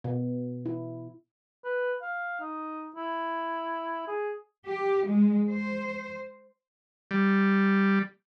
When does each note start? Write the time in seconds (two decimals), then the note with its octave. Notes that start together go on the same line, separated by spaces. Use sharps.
0.04 B2
0.66 E4
1.64 B4
2.02 F5
2.40 D#4
2.96 E4
4.08 G#4
4.67 G4
5.06 G#3
5.49 C5
7.11 G3